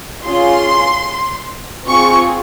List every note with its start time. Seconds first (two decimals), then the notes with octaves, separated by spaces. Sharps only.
0.24 C#4 F4 G#4 C6
1.86 C4 F4 G#4 C#6